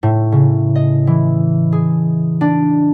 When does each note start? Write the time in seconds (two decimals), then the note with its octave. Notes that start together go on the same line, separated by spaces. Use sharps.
0.03 A2
0.32 C#3
0.76 D#5
1.07 E3
1.72 G#4
2.41 D4